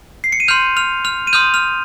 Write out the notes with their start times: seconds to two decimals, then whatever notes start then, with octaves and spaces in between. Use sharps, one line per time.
0.24 C7
0.32 C#7
0.40 D#7
0.48 C6 F6 G6 F7
0.77 F6 F7
1.05 F6 F7
1.27 D#7
1.33 C6 D#6 F6 G6 F7
1.54 F6 F7